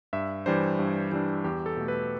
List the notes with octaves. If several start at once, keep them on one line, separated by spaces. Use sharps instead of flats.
G2 E5
E3 G3 D4 C5
G2
E3 G3 D4
E2 G4
A4
B2 A3
B4